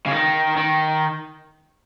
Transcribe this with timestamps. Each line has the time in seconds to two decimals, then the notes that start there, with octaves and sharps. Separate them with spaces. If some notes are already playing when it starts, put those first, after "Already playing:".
0.06 C#3
0.11 D#3
0.57 D#3